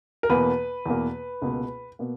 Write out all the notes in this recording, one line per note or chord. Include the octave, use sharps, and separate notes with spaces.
A#4
E2 B2 A#3 B4
E2 B2 A#3
C#2 B2 A#3
B2 A#3